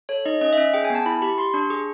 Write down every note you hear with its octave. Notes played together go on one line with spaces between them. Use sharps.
A4 C#5
D#4 D#5
C#4 D#5
E5
C#4
G#4 G5
G#5
B3
A5
E4 B5
G4 B5
G4 C6
D4 C#6
G#4 C#6